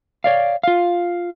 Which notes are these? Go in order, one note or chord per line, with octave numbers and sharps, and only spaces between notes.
C#5 D5 F5
F4 F5